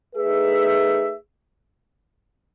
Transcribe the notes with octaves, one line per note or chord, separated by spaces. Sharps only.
A3 D#4 G#4 B4 E5